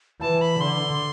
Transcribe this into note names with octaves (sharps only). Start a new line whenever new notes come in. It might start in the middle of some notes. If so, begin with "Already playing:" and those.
E3 A5
B5
D3 C6